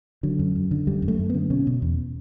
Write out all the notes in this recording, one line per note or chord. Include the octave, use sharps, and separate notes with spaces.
D3 F#3
F#2
F#2
D3
F#2 G3
F#2
A3
F#2
B3
D3
B2 C#4
B2
E2